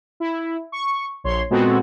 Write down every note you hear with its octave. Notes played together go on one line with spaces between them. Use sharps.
E4
C#6
A#1 C#5 C6
A#2 G#3 B3 C4 F#4 A4